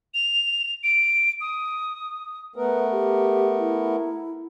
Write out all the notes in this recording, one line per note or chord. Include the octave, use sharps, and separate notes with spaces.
F7
D7
D#6
A3 B3 A#4 B4
G4
E4